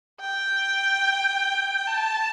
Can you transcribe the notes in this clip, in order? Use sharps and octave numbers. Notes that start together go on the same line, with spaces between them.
G5
A5